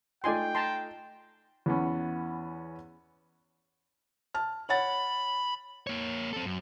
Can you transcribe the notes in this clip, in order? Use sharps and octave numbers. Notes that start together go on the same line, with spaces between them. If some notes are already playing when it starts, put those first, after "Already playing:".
A3 D#4 F4 D5 G5 G#5 C6
A5 A#5 C6
E2 B3 C#4
A5 F6
C#5 F#5 B5 A6
A#3 C#5
C4 A4
F#2